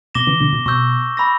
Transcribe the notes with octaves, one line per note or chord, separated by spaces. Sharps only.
B2 D6 A#6 E7 G7
C#3 E3
B2 D3
B2
B2 C#6 E6 G6
B5 E6 A#6